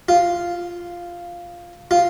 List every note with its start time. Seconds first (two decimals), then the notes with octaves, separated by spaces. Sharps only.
0.09 F4
1.91 F4